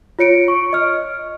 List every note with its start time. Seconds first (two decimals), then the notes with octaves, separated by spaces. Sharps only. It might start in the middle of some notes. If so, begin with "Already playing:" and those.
0.19 F4 C#5 C#7 D7
0.48 C#6
0.73 D#5 F6